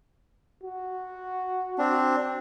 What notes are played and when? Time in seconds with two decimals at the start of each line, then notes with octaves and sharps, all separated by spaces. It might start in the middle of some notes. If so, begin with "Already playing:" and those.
0.63 F#4
1.78 C4 D4